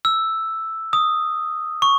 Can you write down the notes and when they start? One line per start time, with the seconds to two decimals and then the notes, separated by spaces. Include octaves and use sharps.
0.05 E6
0.93 D#6
1.82 C#6